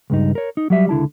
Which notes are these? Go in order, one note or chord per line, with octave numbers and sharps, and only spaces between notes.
C#2 G2 D#4
A#4 C#5
D#4
F#3 G3 E5
C#2 D3 E4 A5